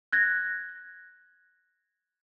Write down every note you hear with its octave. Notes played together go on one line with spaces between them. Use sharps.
F#6 G#6 A#6